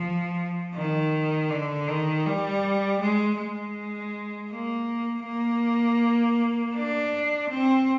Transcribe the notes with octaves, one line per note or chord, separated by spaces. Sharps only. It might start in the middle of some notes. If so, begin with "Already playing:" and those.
Already playing: F3
D#3
D3
D#3
G3
G#3
G#3
A#3
A#3
D4
C4